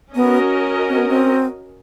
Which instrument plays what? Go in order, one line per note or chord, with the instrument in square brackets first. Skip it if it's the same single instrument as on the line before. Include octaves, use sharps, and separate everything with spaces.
[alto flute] B3 [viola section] C#4 F#4 A#4 D#5
[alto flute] C4
B3
C4